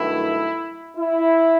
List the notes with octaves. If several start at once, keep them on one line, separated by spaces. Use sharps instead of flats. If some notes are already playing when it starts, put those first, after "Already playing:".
Already playing: G2 D#3 F#3 A3 E4
E4